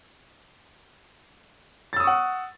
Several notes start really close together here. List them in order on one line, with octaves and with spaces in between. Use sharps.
A6 E6 D#6 C#6 F#5